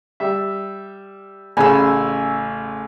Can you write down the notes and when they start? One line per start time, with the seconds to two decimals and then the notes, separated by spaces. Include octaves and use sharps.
0.20 G3 E5
1.57 A1 C#3 G#5 B5 E6